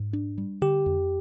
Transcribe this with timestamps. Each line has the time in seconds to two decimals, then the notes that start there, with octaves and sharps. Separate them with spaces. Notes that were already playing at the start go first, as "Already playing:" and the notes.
Already playing: G#2
0.13 D4
0.38 G3
0.61 D3 G4
0.86 F2